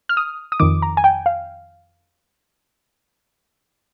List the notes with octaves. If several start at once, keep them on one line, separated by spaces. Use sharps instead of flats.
F6
D#6
D#6
F2 D#3 D6
A#5
G#5
G5
F5